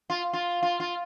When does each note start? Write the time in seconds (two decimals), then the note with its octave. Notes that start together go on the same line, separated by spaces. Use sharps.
0.10 F4
0.33 F4
0.63 F4
0.80 F4